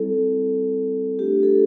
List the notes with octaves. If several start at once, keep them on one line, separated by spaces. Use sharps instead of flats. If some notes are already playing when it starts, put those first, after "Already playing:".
Already playing: G3 C4 E4 A4
A3 D4 F4 G4
A4